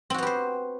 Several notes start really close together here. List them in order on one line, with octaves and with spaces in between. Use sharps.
C4 F#4 B3 G4 C5